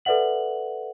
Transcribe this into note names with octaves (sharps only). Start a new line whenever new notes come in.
A4 B4 D5 E5 F#5 F#7